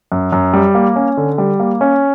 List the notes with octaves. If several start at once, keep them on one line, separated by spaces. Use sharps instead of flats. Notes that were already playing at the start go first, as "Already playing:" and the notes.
F#2
F#2
G3
A#3
C#4
D3
G3
A#3
C#4